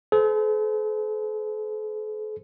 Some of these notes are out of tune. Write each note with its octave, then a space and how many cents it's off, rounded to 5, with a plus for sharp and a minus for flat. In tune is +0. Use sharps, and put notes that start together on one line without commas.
A4 -45 C5 -45